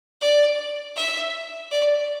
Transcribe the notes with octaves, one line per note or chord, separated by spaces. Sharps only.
D5
E5
D5